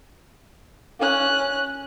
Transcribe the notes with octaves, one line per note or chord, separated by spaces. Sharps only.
C#4 F#6